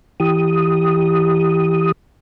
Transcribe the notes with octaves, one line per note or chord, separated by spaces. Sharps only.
E3 G4 D#6